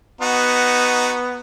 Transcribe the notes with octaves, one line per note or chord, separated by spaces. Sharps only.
B3 D#4 F#4